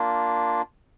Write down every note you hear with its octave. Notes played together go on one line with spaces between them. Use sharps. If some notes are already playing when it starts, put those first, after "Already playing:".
Already playing: A#3 D4 F4